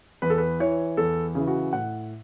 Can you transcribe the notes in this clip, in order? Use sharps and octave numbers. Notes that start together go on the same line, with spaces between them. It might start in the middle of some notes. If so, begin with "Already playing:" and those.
E2 B4
A4
B4
E3 C#5
E2 A4
C#3 E3
F#4
A2 F#5